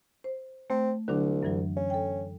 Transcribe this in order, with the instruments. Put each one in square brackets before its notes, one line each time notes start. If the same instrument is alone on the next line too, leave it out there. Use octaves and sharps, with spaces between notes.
[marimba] C5
[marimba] A3 [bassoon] C4
[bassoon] C2 [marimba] D3 F#3 D4
[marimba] F#2 E3 F#3
[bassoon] C#4
[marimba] A4 G5